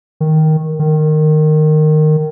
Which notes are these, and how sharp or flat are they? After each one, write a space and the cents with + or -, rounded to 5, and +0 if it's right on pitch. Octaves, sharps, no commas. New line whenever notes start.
D#3 +5
D#3 -15